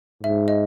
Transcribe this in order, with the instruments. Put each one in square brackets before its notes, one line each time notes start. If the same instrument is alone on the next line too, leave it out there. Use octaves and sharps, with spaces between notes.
[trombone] G#2 [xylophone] E5
[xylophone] D#5